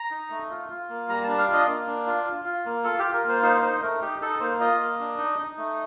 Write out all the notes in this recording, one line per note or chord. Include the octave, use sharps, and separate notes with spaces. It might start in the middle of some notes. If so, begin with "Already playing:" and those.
Already playing: A#5
D#4
A3
F4
F4
A#3
G3 A#5
D4 A5
F5
F4 D#5
A#3
D4
F4
F4
F4
A#3
F4 A4
F4 G4
A#4
A#3 C5
D#4 C5
D#4 C5
A3 A#4
D#4 G4
D#4 A4
A#3 C5
F4 D#5
A#3
D4
D#4
D#4
A3